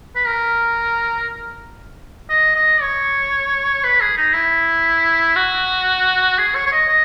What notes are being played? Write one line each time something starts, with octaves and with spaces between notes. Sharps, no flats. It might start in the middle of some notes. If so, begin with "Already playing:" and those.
B4
A#4
D#5
D#5
C#5
B4
G#4
D#4
E4
F#4
G#4
C#5
C#5
D#5
D#5